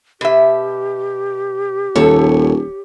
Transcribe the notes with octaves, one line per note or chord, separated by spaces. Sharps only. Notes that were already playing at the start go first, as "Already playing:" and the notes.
B2 G4 E5
D#1 D#2 A4 C#5